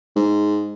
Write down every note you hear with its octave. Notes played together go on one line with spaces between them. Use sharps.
G#2